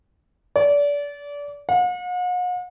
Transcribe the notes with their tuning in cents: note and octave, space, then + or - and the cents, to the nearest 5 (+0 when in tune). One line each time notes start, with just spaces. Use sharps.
D5 -30
F#5 -45